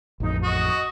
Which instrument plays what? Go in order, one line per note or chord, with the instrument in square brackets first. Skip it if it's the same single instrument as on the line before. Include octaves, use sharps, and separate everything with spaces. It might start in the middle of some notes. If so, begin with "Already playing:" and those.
[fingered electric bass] A1 F2 [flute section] D#4
[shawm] F#4 [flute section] D#5 C#6 D#6